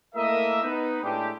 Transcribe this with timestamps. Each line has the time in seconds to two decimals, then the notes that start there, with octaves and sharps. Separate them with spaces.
0.15 A3 A#3 E4 A#4 D#5 E5
0.63 B3 D#4 B4
1.03 A2 G#3 D4 E4 G4